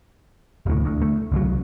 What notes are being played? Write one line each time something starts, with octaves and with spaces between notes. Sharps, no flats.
F1 D2 A2
D2
A3
C2 C#3 F3 F#3